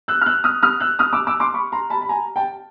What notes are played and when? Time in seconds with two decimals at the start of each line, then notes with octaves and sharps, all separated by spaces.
0.08 E6 F#6
0.22 F6
0.26 E6 F#6
0.44 D#6 F6
0.63 D#6 F6
0.80 E6 F#6
0.99 D#6 F6
1.13 D6 E6
1.27 D6 E6
1.40 C6 D6
1.54 B5 C#6
1.72 A#5 C6
1.90 A5 B5
2.01 B5
2.09 G#5 A#5
2.36 G5 A5